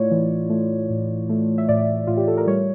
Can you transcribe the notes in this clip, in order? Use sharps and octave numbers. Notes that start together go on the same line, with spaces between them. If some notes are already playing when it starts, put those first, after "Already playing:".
Already playing: A2 A3 E4 F4 C#5 D5
E3
A3
A2
A3
E5
A2 D5
A2 F4
G4
A4
A#4
G3 C#5